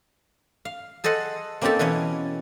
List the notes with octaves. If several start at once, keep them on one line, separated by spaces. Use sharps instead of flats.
F5
G#4 A4 C5 D#5 F#5
A#3 C4 C#4 D#4 G4 A4
B2 E3 C#4 C#5